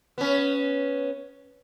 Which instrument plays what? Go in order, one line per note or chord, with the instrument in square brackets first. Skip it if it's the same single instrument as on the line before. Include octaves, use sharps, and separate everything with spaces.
[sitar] B3 C#4